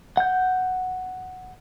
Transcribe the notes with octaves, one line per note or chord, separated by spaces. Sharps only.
F#5 G6